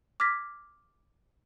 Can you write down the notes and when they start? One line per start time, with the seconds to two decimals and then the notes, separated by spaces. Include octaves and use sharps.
0.20 D6 F6 G#6 A#6 B6